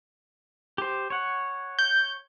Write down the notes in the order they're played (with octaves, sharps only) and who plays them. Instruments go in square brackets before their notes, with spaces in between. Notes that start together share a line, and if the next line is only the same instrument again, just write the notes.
[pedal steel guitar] G4 C5
C#5 F#5
[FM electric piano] G6